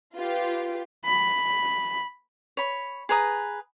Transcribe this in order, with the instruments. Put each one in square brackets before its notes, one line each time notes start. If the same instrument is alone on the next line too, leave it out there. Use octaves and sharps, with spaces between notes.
[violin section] F4 G4 B4
[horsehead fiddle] B5
[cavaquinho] C#5 B5
G#4 B4 A#5 D#6